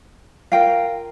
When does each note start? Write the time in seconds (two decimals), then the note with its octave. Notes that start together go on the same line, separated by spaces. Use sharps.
0.52 F4 A#4 F5 G5